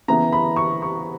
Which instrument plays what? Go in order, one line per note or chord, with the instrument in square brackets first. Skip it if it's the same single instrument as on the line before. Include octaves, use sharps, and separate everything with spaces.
[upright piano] C#3 E3 B3 A#5
B5
C#6
C#6